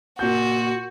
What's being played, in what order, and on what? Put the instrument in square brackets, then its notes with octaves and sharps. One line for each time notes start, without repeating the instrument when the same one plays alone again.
[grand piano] A#2 G6 [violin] F#4